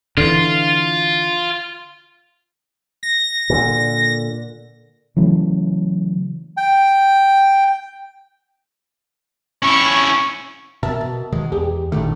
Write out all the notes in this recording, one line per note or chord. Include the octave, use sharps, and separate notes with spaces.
D3 E3 F4
A#6
A#2 D3
C#3 E3 F#3 A3
G5
C#4 E4 C#6
B2 A#4 E5 A5
B2
B2 D#3 G#3
E2 G4 G#4
A1 A#2 D3 D#3 A3